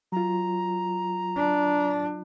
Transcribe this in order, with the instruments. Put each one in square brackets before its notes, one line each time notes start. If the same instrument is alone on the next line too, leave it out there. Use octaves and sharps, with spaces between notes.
[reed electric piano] F#3 F4 [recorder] A#5
[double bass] D4